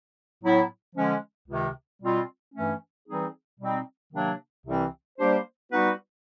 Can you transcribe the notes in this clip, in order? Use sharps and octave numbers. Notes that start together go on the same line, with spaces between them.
A2 F#3 B3 E4
D3 F3 G#3 C#4
C#2 C3 D#3
B2 G3 C4 F4
G2 E3 A3 C#4
E3 G3 C4 D#4 G#4
B2 G3 C4 D#4
C3 D#3 F#3 A#3 D4
C2 C3 E3 G3 C4
G3 A#3 D4 G4 C5
G3 B3 D#4 F#4 B4